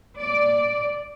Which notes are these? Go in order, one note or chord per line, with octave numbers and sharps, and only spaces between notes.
D5